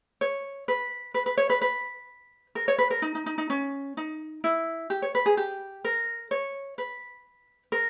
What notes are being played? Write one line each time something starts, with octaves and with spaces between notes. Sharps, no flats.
C#5
B4
B4
B4
C#5
B4
B4
A#4
C#5
B4
A#4
D#4
D#4
D#4
D#4
C#4
D#4
E4
G4
C#5
B4
G#4
G4
A#4
C#5
B4
A#4